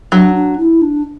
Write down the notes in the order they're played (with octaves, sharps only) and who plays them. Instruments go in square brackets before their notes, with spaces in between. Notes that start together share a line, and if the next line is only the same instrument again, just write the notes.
[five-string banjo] F#3 [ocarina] D4
[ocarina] D4
E4
D4